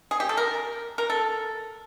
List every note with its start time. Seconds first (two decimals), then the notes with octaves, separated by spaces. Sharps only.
0.11 G#4
0.20 G4
0.29 A4
0.37 A#4
0.98 A#4
1.10 A4